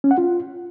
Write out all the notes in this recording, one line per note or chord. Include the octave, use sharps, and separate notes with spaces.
C#4
F#5
F4